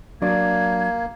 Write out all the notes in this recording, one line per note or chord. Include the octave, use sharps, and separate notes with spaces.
F#3 A#3 D4 G#6